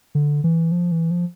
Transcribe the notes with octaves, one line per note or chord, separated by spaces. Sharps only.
D3
E3
F3
E3
F3